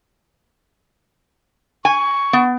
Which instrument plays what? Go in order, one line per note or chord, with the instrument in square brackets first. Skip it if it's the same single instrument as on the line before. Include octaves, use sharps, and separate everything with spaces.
[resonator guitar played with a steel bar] G#5 [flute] C#6
[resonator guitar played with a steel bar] B3